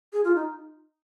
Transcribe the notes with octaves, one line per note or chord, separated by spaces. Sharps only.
G#4
F4
D#4